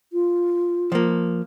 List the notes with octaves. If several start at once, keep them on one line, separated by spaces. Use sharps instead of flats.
F4
F3 A#3